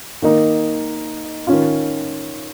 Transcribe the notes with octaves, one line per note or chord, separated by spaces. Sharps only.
D#3 A#3 D#4
D#3 C#4 F4